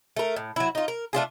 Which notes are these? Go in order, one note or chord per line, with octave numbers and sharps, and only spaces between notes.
A3 A#4
A2
F#3 E4
D#4 F4
A#4
A3 D4 F4 G#4